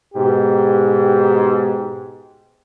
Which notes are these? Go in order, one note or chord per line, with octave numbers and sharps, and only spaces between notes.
G#2 B2 G4